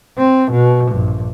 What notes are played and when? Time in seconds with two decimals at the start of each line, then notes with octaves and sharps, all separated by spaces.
0.18 C4
0.52 B2
0.90 A#1 G2